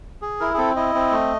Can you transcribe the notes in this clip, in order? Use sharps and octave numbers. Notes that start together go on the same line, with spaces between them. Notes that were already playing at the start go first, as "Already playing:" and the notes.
G#4
E4 A#4
G#4
C4 A4
E4 D#5
C4
A3